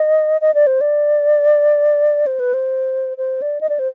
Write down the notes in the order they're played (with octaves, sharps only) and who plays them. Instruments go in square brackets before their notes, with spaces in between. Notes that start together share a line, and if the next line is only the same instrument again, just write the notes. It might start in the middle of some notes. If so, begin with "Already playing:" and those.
Already playing: [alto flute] D#5
D#5
D5
C5
D5
C5
B4
C5
C5
D5
D#5
D5
C5